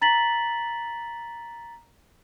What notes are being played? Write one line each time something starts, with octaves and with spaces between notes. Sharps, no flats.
A#5 A6 B6 F#7